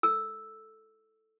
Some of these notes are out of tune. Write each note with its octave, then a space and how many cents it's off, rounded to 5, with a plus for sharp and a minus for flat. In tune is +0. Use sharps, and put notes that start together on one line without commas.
A4 +0 E6 +0